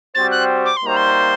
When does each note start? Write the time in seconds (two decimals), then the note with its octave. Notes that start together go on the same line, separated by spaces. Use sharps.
0.15 G3 C4 F#4 C5 A6
0.31 F#6
0.66 D6
0.77 C6
0.83 G3 A#3 D#4 F#4 C5 A#5
0.97 C6